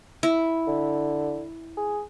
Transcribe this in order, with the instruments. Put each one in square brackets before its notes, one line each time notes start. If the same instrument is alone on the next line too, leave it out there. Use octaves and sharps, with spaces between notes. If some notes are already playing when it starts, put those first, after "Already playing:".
[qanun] E4
[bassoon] D3
G#4